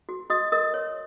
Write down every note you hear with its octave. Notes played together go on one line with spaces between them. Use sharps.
F#4
F#4 D#5 D#6
A#4 D#5 D#6
C#5